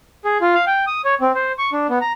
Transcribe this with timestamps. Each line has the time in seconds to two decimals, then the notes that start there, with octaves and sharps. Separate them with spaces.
0.25 G#4
0.41 F4
0.55 F5
0.67 G5
0.87 D#6
1.05 C#5
1.21 C4
1.35 C5
1.58 C#6
1.73 D4
1.90 B3
2.01 A#5